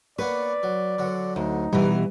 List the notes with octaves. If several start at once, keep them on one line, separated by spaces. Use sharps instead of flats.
A#3 B3 B4 C#5 D5
F#3
D3 F#3
D2 D#4
B2 E3 G3 B3